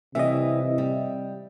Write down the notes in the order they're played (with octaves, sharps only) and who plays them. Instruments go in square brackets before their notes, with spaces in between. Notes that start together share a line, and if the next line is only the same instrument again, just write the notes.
[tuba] C3 [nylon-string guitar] E3 G3 [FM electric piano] D#5 E5
[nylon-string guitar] G3